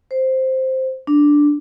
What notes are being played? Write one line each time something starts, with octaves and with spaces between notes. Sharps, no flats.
C5
D4